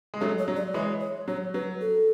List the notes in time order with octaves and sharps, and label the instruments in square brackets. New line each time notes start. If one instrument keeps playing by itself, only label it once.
[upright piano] G#3
[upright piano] F#3 A3 [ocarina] C#5
[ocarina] C#5
[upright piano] F#3
[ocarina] D5
[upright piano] E3 G#3 [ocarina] C#5
[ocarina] C#5
[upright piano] F#3 [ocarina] C#5
[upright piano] F#3 [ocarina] B4
[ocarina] A4